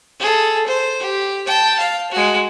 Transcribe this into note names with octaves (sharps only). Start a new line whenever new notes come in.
G#4 A4
C5
G4
G5 A5
F5
G#3 F#4